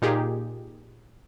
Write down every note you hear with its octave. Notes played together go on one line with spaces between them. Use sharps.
A#2 D#4 F4 G4 G#4